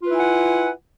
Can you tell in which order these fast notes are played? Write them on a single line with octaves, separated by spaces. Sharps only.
F4 B4 E4 G#5 F#5